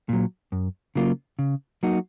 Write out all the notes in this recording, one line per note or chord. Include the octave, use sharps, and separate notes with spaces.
A#2 F#3
F#2
C#3 F#3 A#3 F4
C#3
F#3 A#3 D#4 F#4